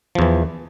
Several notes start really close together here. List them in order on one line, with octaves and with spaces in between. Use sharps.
F3 E2 E3